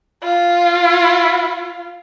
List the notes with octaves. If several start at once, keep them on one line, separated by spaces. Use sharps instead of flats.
F4